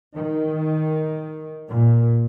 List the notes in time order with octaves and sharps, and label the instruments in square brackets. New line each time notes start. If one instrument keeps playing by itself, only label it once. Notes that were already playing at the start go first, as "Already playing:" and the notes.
[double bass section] D#3
A#2